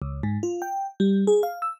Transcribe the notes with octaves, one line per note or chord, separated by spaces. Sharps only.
C#2
G#2
F4
G5
G3
G#4
F5
E6